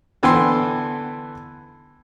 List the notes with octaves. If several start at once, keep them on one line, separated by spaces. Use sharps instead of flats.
D3 E3 B3 A4 G5 C6